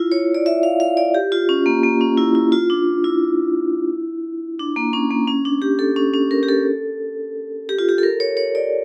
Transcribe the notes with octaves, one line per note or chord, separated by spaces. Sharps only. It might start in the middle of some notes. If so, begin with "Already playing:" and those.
Already playing: E4 F4
C#5
D5
E5
F5
F5
D5
G4
F4
C#4
A#3
A#3
C#4
E4
E4
F4
D4
E4
D4
A#3
C#4
A#3
C#4
D4
G4
A4
C#4
C#4
A#4
G4
A4
G4
F4
G4
A4
A#4
C#5
C#5
D5